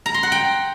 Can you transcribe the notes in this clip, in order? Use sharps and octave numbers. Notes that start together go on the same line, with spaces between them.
A#5
C6
F#5
G5